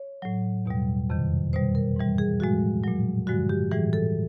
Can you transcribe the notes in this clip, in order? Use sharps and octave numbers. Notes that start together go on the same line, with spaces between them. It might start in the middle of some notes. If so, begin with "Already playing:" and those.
Already playing: C#5
A2 F#3
E2 B2 G3
F2 C3 D#3
B2 G3 C5
A#4
G#2 E3 G3
G#4
A2 F3 G#3 F#4
A#2 F#3
G2 D3 F3 G#3 F#4
G4
A2 E3 G3 G#4
A4